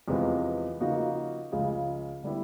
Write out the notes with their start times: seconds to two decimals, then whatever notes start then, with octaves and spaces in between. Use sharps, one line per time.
0.08 E2 C3 F3 G#3 B3
0.80 C#3 F3 A#3 D#4 F#4
1.52 C#2 C#3 F3 G#3
2.23 D3 G3 B3 E4